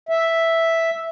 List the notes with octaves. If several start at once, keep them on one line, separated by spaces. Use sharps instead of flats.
E5